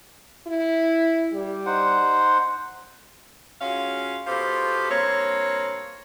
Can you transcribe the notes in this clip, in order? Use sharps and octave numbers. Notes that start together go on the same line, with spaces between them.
E4
G3
D#4 C5 F#5
G#3 C#4 F4 F#4 C#5 F5
B2 F4 G4 A4 C5
G2 A#3 C4 C#5